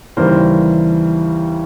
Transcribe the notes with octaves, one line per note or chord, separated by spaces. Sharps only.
D#2 C#3 E3 G3 A#4 C5